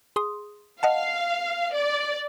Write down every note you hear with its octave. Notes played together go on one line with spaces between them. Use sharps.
G#4 C6 D#6
D#5 F5 F#5 A5
D5